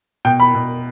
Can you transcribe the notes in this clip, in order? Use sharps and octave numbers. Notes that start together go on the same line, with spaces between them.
B2 G5
B5
B2